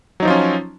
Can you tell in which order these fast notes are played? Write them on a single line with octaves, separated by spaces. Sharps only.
F#3 D#4 F3 F4 C#4